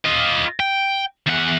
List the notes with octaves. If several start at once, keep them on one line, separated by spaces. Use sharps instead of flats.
F4 D#5
G5
E2 F#5